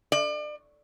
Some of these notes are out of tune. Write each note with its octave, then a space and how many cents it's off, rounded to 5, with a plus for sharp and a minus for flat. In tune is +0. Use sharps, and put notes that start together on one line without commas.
D5 +35